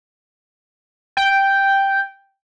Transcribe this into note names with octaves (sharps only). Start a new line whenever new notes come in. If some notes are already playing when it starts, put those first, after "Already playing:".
G5